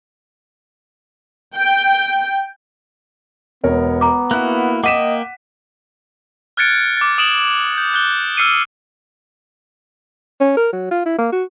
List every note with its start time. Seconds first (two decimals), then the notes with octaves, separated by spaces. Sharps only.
1.56 G5
3.64 E1 B3 A#4 C#5
4.01 A#5 D6
4.31 A#3 E4 F#4 F#6
4.84 A#3 D#5 F#5 G5 D6 B6 D#7 E7
6.57 F6 F#6 G#6 A6 C#7 D7
6.97 D6 A6
7.18 D#6 D7 E7 F#7
7.77 G6
7.94 F#6 G6 G7
8.37 E6 F6 C7 C#7 D#7
10.41 C#4
10.57 A#4
10.72 F#3
10.91 F4
11.05 E4
11.18 A#3
11.32 F#4